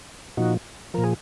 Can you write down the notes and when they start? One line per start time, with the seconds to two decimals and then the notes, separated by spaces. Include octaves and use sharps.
0.37 A#2 F3 D#4 F#4
0.94 A#2 F3 A#4
1.04 G#4